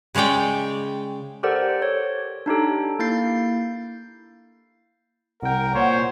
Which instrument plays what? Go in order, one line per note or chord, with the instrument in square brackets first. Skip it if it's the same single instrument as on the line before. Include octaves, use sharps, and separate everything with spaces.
[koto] C#3 G#3 C#5 D5 G5
[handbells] G4 A4 A#4 C5 D5 F#5
C#5
D4 D#4 G4 A4
A#3 E4 G6 A6 C7
[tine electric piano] C2 G5 [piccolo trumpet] A#4 [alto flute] F#5
[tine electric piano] A#2 [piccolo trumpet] C5 [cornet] C#5